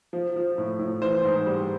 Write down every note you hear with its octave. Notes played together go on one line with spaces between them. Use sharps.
F3
F3
A2
A2
E3 C5
G#2
G3